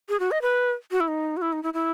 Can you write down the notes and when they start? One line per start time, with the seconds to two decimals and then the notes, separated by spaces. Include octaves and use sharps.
0.09 G#4
0.20 F#4
0.31 D#5
0.42 B4
0.92 F#4
1.00 E4
1.08 D#4
1.37 F#4
1.42 E4
1.53 D#4
1.63 E4
1.74 E4